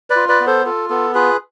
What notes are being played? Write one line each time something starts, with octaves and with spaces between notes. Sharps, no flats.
B4 D5
F4
B4 D5
B3
A4 C5
F4 A4
B3 A4
F4 G#4 B4